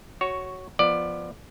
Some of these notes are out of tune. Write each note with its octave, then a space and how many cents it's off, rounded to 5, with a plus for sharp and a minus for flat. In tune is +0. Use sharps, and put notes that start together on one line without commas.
F#4 +10 C#5 +0
F3 +0 B3 +0 D5 +20